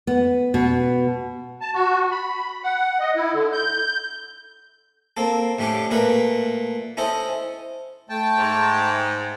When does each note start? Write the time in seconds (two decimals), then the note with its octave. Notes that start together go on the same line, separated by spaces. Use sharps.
0.07 B3
0.54 B2
1.61 A5
1.74 F#4
2.11 B5
2.64 F#5
3.00 D#5
3.16 E4
3.33 D3
3.53 G6
5.17 A#3 C4 A4
5.59 A2 G3 C#4 D4 D6
5.91 A#2 A3 A#4 B4 B5
6.97 C#4 E4 A4 C5 D#5
8.09 A3 G5 A5
8.38 G#2